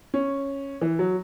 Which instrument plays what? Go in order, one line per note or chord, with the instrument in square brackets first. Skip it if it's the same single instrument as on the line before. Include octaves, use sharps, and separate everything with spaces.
[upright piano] C#4
E3
F#3